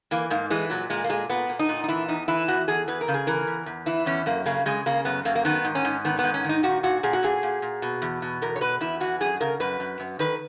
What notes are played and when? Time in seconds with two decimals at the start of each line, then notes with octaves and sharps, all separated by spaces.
0.11 E3 A#3
0.30 G#2 A#3
0.50 E3 G#3
0.70 A#2 F#3
0.90 A#2 G#3
1.04 A#3
1.09 A#2 G#3
1.29 A#2 B3
1.49 A#2
1.59 D#4
1.69 A#2
1.84 D#4
1.88 E3 E4
2.08 E2 D#4
2.28 E3 E4
2.48 E2 F#4
2.68 E2 G#4
2.88 E2 B4
3.01 A#4
3.08 C#3
3.14 G#4
3.27 E3 A#4
3.47 E2
3.66 E2
3.86 E3 E4
4.06 E2 C#4
4.26 F#2 A#3
4.46 C#3 A#3
4.66 C#3 G#3
4.86 C#3 A#3
5.05 F#2 B3
5.25 F#2 A#3
5.35 A#3
5.45 D#3 B3
5.65 G#2
5.75 C#4
5.85 G#2
6.05 D#3 B3
6.19 G#2 B3
6.34 C#4
6.44 D#3 D#4
6.63 A#2 F#4
6.83 A#2 F#4
7.03 A#2 G#4
7.13 F#4
7.23 A#2 G#4
7.43 A#2
7.62 A#2
7.82 B2
8.02 E2
8.22 B2
8.42 E2 A#4
8.56 C#5
8.61 B2 B4
8.81 E2 E4
9.00 E3 F#4
9.21 F#2 G#4
9.41 C#3 A#4
9.60 F#2 B4
9.80 F#2
10.00 F#2
10.19 D#3 B4